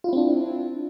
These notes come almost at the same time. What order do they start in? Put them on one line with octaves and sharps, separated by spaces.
F4 E4 C4 D4